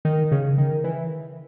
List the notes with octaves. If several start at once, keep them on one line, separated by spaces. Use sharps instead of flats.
D#3
C#3
D#3
E3